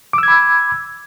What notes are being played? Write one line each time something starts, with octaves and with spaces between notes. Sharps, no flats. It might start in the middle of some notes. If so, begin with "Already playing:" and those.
B5 D6 E6 G#6